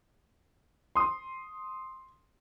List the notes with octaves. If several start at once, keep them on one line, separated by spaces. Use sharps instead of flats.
C6 D#6